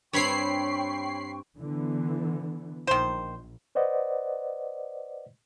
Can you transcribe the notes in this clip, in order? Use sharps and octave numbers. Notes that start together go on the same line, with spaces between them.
G2 C4 C#5 G5 B5 C#6 C7
D3 E3 B3
A#1 D#3 C5
B4 C5 D5 D#5 F#5